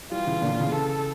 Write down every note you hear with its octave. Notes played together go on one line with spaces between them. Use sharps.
E3 G3 F4
C#3 E3
A#2 D3
A#2 D3
C#3 E3
A4